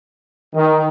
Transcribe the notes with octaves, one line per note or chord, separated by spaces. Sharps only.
D#3